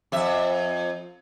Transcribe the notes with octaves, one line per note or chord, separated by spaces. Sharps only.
F2 E5